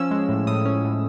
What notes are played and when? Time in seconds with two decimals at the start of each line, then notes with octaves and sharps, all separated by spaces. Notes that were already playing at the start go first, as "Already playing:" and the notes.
Already playing: F3 C#4 E6
0.11 G#3
0.29 A2
0.47 A2 D#6
0.65 C#4
0.84 A2